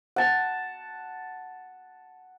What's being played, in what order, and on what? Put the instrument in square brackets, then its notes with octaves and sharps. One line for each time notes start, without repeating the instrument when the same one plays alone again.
[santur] F#5 A5